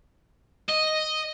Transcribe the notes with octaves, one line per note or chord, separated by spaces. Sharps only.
D#5